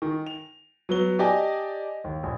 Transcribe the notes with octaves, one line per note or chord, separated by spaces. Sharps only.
D#3
F7
F#3 B3 G7
G4 D5 D#5 G#5 A5
D#2
A#1